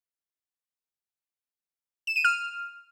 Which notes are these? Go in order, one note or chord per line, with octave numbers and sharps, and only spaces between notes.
E7
D#7
F6